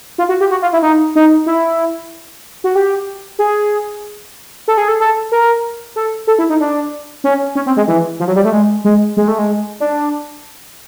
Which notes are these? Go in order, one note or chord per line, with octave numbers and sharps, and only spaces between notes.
F4
F#4
G4
F#4
F4
E4
D#4
D#4
E4
F#4
G4
G#4
A4
G#4
A4
A4
A#4
A4
A4
E4
D#4
D4
C#4
C#4
C4
G#3
E3
F3
F#3
G3
A3
G#3
G#3
G#3
A3
G#3
D4